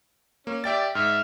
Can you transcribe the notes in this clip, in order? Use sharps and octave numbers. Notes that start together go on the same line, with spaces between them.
A#3 C#4
G4 D5 E5 G5 A6
G#2 E5 F6